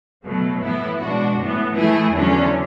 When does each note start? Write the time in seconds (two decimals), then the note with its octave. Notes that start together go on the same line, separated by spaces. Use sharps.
0.24 B2 F#3 A3
0.62 A2 E3 B3 E4
1.00 B2 G#3 D4 F#4
1.38 A2 E3 B3
1.76 E3 A3 E4 G#4
2.13 E2 D3 F#3 C#4